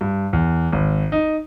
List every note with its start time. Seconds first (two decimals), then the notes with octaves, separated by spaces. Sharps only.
0.01 G2
0.33 E2
0.72 G#1
1.12 D#4